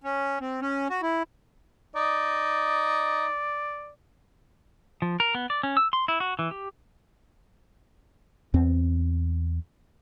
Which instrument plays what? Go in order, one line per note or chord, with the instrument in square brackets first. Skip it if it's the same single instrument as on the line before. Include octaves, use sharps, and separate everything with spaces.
[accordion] C#4
C4
C#4
F#4
E4
[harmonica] D#4 [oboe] D5
[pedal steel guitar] F3
A#4
B3
D5
C#4
E6
C6
E4
F#4
E3
G4
[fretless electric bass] E2 C4